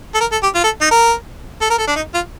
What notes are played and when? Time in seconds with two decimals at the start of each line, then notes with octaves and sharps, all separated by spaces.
0.14 A4
0.20 A#4
0.32 A4
0.43 G4
0.55 F4
0.64 A4
0.81 D#4
0.91 A#4
1.61 A4
1.70 A#4
1.78 A4
1.87 D4
1.96 D#4
2.14 F4